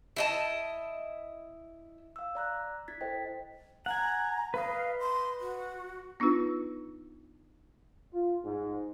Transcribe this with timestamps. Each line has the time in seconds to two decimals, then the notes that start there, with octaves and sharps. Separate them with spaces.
0.16 E4 D#5 A5
2.16 F5 E6
2.35 D5 A#5 F#6
2.88 E4 G#6 A6 B6
3.01 A4 C5 D#5 G5
3.86 F#5 G#5 A#5
4.54 B4 D#5 F5
5.00 C6
5.40 F#4
6.20 B3 D4 D#4 F4 B4
8.14 F4
8.43 G#2